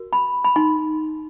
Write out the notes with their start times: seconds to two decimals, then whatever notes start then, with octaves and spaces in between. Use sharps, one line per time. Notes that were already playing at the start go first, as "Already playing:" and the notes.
Already playing: F#4 A#4
0.13 B5
0.44 B5
0.56 D#4 C6